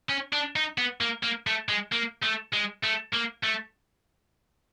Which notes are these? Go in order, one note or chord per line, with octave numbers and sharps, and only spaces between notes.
C#4
D4
D#4
B3
A#3
A#3
A3
G#3
A#3
A3
G#3
A3
A#3
A3